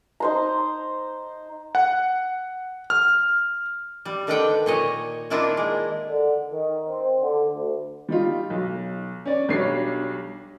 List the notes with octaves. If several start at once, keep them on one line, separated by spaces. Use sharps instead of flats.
D#4 C5 A#5
F#5
F6
G3
D3 D#3 D4 B4 F#5 G5
A#2 C#5 D#5
D#3 A#3 D4 E4 F4 A#4
G#3
D3
D#3
C4
D3
D2
G3 D#4 F4
B1
C#4 D5
B1 F#3 G3 D4 C#5 C7